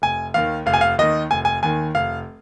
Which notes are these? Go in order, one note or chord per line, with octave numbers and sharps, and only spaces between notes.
F1 G#5
D#2 D#3 F5
F1 F5
G#5
F5
D#2 D#3 D#5
F1 G#5
G#5
D#2 D#3 G#5
F1 F5